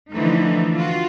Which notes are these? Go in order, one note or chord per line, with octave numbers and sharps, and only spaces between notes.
D3 E3 F3 A3 D#4
F4 F#4